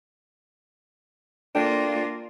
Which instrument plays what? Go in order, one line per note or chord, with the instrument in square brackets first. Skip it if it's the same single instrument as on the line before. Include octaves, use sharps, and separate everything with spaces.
[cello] A#3 F4 [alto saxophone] D4 [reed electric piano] A4 D5 G5